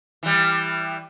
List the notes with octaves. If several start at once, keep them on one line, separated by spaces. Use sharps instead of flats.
E3 G3